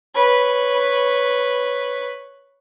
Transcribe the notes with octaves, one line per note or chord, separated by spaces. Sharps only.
B4 C#5